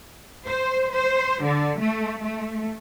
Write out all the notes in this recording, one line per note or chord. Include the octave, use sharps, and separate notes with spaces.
C5
C5
D3
A3
A3